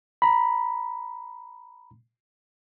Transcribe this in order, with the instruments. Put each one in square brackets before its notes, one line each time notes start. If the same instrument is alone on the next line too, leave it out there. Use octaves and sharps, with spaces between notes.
[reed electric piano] A#5 B5